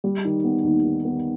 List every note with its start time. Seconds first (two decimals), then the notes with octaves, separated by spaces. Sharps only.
0.04 G3
0.25 D#3
0.44 B3
0.64 D#2
0.84 D#3
1.05 B3